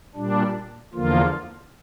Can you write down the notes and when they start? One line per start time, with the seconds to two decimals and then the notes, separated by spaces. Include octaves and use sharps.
0.16 A#2 G3 D4
0.94 E2 D3 F3 A#3 F4